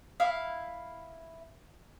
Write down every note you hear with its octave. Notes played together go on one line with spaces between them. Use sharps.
E4 F5